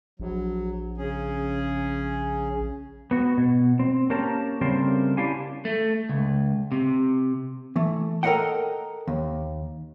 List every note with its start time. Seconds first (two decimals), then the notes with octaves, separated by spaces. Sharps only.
0.20 A#1 F#3
0.98 C#3 C#4 G#4
3.11 B3 F#4
3.37 B2
3.79 C4
4.10 A#3 C#4 G4 A#4 A5
4.61 C#3 G3 A3 C4 A#4 C5
5.17 C#4 D4 E4 G4 F5 G#5
5.65 A3
6.09 C#2
6.72 C3
7.76 E3 A3
8.23 A4 A#4 C5 D#5 F#5 G5
9.08 D#2